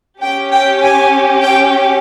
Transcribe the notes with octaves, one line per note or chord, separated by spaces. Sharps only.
C#4 G4 G5
G5
G#5
G5